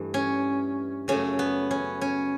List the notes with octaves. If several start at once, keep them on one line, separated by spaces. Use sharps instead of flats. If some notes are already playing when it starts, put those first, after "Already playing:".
Already playing: G2 E3 A3
C#4
F#2 C#3 F#3 A3 C#4
B3
C#4
C#4